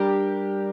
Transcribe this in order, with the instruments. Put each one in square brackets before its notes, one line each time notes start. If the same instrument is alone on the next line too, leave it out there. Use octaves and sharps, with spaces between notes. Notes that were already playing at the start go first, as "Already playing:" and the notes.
Already playing: [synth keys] G3 D4 G4 A#4